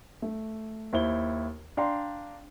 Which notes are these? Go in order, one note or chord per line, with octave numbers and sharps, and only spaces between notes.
A3
D#2 E4 C5 G7
D4 D5 F5 G5 A#5 C6